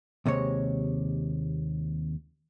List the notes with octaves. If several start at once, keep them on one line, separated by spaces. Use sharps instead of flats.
D#2 C3 G#3 C#5